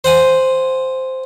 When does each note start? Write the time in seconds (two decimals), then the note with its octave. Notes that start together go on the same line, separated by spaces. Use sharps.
0.04 C5 F#5 G#5